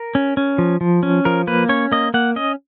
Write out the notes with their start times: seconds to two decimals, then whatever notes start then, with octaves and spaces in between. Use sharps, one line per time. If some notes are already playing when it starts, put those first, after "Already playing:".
Already playing: A#4
0.15 C#4
0.37 C#4
0.58 F3
0.81 F3
1.03 C#4
1.25 F3 A#4
1.47 A#3 B4
1.69 C#4 C#5
1.92 A#3 D#5
2.14 A#3 F#5
2.36 C#4 D#5